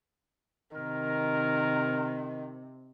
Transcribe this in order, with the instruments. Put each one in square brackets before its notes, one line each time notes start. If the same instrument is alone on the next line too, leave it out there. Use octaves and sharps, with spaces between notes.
[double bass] C3 [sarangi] D#3 [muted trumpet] A#4